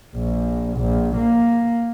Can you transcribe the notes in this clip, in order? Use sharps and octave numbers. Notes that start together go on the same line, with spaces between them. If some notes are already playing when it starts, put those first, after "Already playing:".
A#1
A#1
A#3